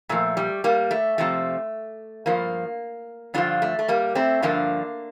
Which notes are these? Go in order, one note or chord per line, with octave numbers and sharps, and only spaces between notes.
A#2 F3 A3
G3
G3 A#3
A3
F2 C3 F3 A3
G2 F3 A#3
G2 D3 F3 D4 F4
A3
A3
G3 A#3
A3 C4
G2 D3 F3 A#3 D4